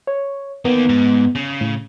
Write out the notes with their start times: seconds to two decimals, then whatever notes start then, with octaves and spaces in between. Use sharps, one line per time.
0.07 C#5
0.65 D#3 A#3 B3
0.89 G#2
1.35 C#3
1.61 A2